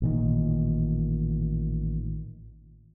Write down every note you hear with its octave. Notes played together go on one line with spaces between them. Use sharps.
A1 A#2 D#3